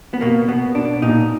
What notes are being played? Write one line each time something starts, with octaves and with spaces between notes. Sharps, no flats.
B3
B2 A#3
B2 B3
B2 D4
A#2 D#4